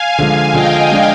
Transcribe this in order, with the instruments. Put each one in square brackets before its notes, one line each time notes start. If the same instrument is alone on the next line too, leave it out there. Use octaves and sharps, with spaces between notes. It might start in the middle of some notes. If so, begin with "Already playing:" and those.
Already playing: [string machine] F5 G#5
[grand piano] D3 F3 G#3
[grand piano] D3 F3 G#3 [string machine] D#5 G5
[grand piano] F3 G#3 D4